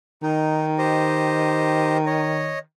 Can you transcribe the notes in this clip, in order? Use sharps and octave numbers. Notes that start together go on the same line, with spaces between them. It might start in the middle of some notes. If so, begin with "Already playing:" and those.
D#3 D#4
G4 C5 D#5
C#5 D#5